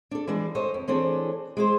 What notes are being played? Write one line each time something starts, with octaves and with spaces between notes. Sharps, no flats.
D4 A4
E3 G3 G#3 D4
A4 C5 C#5 D#5
F2
E3 C4 D4 G#4 A4 C#5
G#3 E4 C5